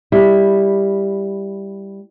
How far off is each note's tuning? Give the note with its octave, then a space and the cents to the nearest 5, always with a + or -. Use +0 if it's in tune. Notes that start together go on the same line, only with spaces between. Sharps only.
G3 +5 E4 +0